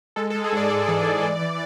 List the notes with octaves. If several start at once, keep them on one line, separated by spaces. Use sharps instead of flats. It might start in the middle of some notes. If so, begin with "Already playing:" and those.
G#3 A4
A4
G#3
G#4
G#2 D5
G#3
E3
G#3
E3
E3